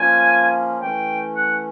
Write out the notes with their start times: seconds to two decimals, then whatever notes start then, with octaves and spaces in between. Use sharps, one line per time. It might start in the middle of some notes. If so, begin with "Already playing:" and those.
Already playing: F3 A#3 C#4 F4 G#5
0.81 E3 A3 C#4 G5
1.36 F#5